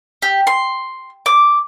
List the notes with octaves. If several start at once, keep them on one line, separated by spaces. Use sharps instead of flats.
G4
C6
D6